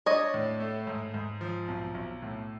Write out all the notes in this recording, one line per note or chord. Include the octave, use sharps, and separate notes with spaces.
D4 C#5 D#5
A2
A3
G#2
G#2
F3
B1
B1
A2